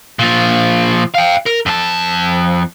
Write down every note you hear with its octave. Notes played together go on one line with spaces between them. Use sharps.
A#2 F3
F5 G5
A#4
F2 A5